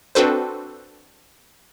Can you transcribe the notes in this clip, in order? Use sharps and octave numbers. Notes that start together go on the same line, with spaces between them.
C4 D4 F#4 A4 B4 C5